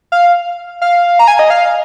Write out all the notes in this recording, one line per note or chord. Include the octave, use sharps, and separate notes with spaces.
F5
F5
A#5
G#5
D#5
F5